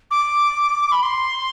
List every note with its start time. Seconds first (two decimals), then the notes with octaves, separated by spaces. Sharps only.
0.11 D6
0.92 B5
1.03 C6